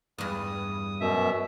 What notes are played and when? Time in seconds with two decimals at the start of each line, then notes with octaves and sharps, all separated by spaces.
0.18 E2 G2 D#6
1.01 F#2 B2 E5